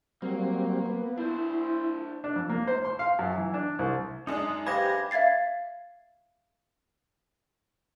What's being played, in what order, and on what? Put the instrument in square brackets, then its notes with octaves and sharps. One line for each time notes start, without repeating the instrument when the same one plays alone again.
[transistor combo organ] F#3 G3 C4 [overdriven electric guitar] A#3
[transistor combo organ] B3
[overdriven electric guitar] D4 C5 [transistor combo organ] E4
[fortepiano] D4
F2
A#3
C5
C6
F5
F#2
E3
D4
C2
[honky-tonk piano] F#2 G#3 D4 [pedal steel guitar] D#4 [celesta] D#6
[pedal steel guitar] G4 G#5 [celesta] B4 C5 F5 [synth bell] B5 D6 A#6
[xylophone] E5 F5 G#6 A6 C7